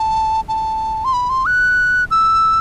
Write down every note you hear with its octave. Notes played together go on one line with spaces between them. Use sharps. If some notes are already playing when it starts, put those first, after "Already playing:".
Already playing: A5
A5
C6
B5
C6
F#6
E6